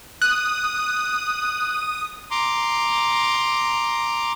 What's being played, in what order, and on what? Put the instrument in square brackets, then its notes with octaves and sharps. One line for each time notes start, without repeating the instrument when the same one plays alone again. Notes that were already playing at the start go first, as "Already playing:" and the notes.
[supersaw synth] D#6 [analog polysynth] F#6
[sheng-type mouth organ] A#5 C6 D6